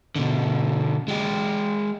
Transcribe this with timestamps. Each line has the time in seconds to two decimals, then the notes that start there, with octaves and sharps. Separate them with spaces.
0.16 B2 D3
1.08 G#3 G4